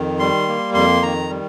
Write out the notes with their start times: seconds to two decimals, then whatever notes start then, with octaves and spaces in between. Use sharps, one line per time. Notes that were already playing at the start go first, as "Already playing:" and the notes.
Already playing: F2 D#3
0.19 G3 C6
0.48 A#3
0.74 F2 C6
1.03 D#3 A#5
1.29 G3